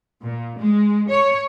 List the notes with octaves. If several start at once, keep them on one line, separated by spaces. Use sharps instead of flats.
A#2
G#3
C#5